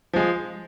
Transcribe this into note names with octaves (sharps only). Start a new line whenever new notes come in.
F3 G#3